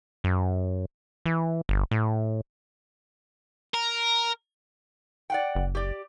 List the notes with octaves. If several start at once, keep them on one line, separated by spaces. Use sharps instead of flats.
F#2
E3
G1
A2
A#4
D5 F#5 G5
F#1
G4 D5